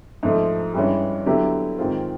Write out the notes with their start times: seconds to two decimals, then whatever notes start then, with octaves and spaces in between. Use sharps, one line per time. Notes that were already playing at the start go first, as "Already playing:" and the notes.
0.23 G#2 F3 A3
0.74 G2 E3 G#3 C#4
1.26 D3 F#3 B3 E4 G4
1.78 G#2 D#3 G#3 C4 F4